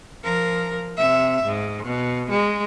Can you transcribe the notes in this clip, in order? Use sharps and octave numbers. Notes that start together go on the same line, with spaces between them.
F3 A#4
C3 E5
G#2
B2
G#3